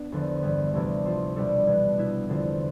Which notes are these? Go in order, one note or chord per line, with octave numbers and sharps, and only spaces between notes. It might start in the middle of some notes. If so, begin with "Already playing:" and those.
Already playing: B3 D4
E2 D3 F3
G2 E3 G3 B3
D2 C3 E3 A3 D4
F3 C4 F4
B2 G3 D4 A4 D5
E3 B3 D4
B2 B3 E4
E2 D3 F3 C4 F4